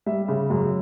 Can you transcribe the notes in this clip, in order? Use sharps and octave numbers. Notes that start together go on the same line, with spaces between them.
G3 E5
C#3
F#2